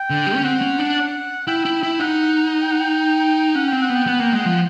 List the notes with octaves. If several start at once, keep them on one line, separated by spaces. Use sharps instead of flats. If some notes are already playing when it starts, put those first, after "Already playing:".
Already playing: G5
D3
G3
C#4
C4 F#5
C#4
D4
F#5
E4 G5
E4
E4
D#4 F#5
G5
F#5
G5
C#4 F#5
C4 G5
F#5
B3
G5
B3 F#5
A#3 G5
G#3 F#5
F3